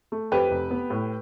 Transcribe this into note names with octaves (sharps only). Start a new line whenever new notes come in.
A3
F2 G4 B4
F1
B3
A2